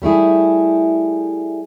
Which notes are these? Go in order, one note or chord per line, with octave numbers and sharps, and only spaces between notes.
G3 A3 E4 G#4